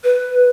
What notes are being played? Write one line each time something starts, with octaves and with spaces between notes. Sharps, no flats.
B4